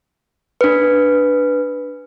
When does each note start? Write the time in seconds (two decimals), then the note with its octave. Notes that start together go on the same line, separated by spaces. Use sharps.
0.61 D4 B4